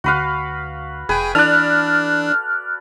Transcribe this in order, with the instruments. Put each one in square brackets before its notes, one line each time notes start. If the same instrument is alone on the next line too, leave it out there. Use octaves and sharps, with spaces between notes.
[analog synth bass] D2 [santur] F#4 B4 F5
[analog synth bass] F1 [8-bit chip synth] G#4 G5 [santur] B4 G#5
[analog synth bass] E3 [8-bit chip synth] D4 [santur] A4 D5 [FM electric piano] F6 F#6